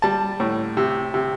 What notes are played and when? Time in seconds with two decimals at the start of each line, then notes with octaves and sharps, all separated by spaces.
0.02 G3 A5
0.40 A2
0.77 C3
1.14 C3